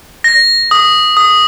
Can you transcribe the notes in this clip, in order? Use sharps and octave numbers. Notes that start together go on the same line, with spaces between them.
A#6
D#6
D#6